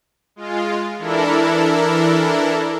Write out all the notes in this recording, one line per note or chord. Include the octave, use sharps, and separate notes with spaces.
G#3 F4
E3 D4 E4 A4 A#4